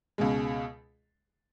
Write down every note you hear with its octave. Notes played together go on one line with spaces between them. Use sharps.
C#2 B2 G#3